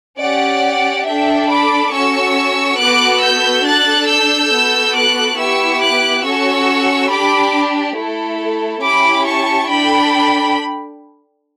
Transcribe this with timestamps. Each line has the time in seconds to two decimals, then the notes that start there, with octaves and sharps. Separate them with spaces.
0.19 C#4 G4 D5 F#5
1.06 D4 A4 E5 G5
1.49 B5 D6
1.92 C#4 F#4 A4 C#6 E6
2.79 B3 F#4 A4 D6 F#6
3.22 E6 G6
3.65 D4 A4 F#6 A6
4.08 E6 G6
4.51 B3 F#4 A4
4.94 D6 F#6
5.38 B3 E4 G4 C#6 E6
5.81 D6 F#6
6.24 C#4 F#4 A4 C#6 E6
7.10 D4 G4 B5 D6
7.96 A3 E4 A4
8.83 C#4 E4 G4 B5 D6
9.26 A5 C#6
9.69 D4 A4 G5 B5